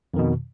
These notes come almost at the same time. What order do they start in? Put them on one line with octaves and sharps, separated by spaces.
F2 D#3 B2